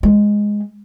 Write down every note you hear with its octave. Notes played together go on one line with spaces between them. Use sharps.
G#3